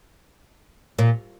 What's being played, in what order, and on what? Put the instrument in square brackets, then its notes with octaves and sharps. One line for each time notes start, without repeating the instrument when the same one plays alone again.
[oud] A#2